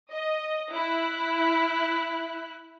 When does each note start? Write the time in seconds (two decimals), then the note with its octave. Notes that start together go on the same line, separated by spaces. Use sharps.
0.12 D#5
0.72 E4 F#6